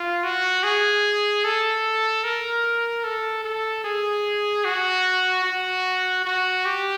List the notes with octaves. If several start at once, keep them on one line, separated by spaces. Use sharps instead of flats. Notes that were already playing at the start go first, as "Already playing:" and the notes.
Already playing: F4
F#4
G#4
A4
A#4
A4
A4
G#4
F#4
F#4
F#4
G4